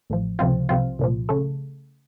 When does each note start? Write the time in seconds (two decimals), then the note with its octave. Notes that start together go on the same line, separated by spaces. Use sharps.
0.10 A1 A2 F3
0.39 C#2 C3 F3 C4 F4
0.69 C2 C3 F3 C4 F4
0.99 C2 A#2 F3
1.29 C#3 A3